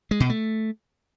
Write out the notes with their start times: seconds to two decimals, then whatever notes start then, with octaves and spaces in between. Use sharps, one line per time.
0.11 G#3
0.20 B2
0.29 A3